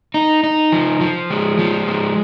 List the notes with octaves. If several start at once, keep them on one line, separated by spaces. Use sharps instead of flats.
D#4
D#4
F3
F3
G#3
F3
G#3